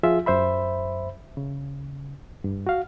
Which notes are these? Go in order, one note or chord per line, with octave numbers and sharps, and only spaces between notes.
F3 F4 G#4 E5
F#2 C5 E5 B5
C#3
G2
F#4 F5